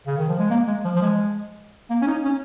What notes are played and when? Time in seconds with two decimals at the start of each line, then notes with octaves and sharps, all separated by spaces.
0.07 C#3
0.18 D#3
0.28 F3
0.39 G#3
0.51 A#3
0.67 G#3
0.85 F3
0.96 F3
1.02 G#3
1.90 A#3
2.02 C#4
2.07 D#4
2.25 C#4